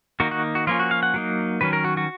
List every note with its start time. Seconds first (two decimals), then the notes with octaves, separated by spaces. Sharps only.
0.20 D#3 A#3 D#4 F#4
0.31 F#4
0.55 F#4
0.67 F3 A#3 C#4 F4
0.79 F#4
0.91 F5
1.03 F#5
1.14 F#3 A#3 D#4
1.61 D#3 F#3 C#4 B4
1.73 A#4
1.84 F#4
1.97 F#4